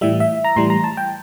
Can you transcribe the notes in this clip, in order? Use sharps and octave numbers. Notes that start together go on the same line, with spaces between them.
A2 E3 G3 E5
E5
A#5
A2 E3 G3 C6
A#5
A5
G5